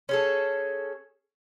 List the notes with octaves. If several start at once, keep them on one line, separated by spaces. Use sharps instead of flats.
C#4 G#4 A4